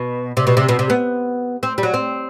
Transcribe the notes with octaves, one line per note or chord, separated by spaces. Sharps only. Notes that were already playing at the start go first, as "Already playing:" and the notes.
Already playing: B2
C3
B2
C3
B2
C3
B3
C4
G3
F#3
C4